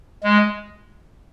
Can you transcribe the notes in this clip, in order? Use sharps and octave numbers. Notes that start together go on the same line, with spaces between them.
G#3